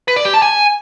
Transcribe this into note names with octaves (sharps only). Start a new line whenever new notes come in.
B4
D5
G4
A5
G#5